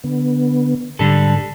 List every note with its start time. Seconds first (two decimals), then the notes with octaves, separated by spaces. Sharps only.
0.04 D3 B3
0.99 G#2 D3 G3 A4